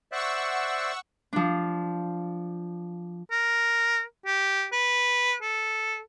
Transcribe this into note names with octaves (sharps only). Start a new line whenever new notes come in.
C5 D5 E5 F#5 C#6 E6
F3 D4
A#4
G4
B4
A4